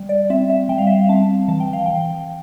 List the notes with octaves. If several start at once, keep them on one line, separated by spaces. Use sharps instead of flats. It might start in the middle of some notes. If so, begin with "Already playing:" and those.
Already playing: G3
D5
C4 E5
E5
G3 G5
F5
E5
F5
C4 A5
E3 A5
G5
F5
E3 G5